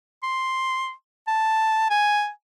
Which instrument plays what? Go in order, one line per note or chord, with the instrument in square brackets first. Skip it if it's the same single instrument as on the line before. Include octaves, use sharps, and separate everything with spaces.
[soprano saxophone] C6
A5
G#5